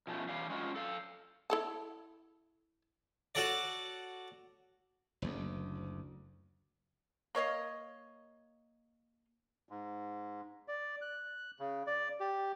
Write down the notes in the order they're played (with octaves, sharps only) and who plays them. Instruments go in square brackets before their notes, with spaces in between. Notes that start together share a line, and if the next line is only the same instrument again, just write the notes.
[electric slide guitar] B2 F3 A3 C#4
E3 G3 C#4 F5
G#3 C#4 F4 F#4
A4 F5
[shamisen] E4 A4 A5
[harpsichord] F#4 A4 C#5 D5
[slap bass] F#1 D2
[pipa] A#3 C#5 D#5 F5
[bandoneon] G#2
D5
F#6
C#3
D5
G4